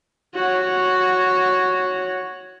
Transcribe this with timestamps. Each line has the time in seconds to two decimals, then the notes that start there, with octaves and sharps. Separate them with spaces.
0.35 F#4 C#5